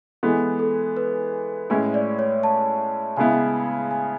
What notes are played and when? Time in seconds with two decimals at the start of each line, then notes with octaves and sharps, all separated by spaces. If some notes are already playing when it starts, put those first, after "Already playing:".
0.23 E3 G#3 B3 A4
0.59 A4
0.97 B4
1.70 A2 G#3 C#4 E4 C#5
1.94 D5
2.19 C#5
2.43 A5
3.17 C#3 G#3 B3 E4 G#5
3.91 G#5